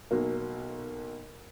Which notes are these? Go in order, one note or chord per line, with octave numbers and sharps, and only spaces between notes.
B1 F#3 A#3